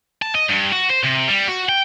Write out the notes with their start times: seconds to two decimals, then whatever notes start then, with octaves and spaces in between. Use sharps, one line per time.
0.22 A5
0.35 D#5
0.49 G2
0.73 F#4
0.90 C5
1.05 C3
1.28 G3
1.48 F#4
1.69 G5